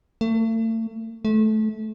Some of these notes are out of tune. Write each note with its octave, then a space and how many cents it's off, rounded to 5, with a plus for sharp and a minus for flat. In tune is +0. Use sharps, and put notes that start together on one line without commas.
A3 +40
A3 -20